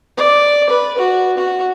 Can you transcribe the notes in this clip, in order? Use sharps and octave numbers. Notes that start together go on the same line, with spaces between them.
D5
B4
F#4
F#4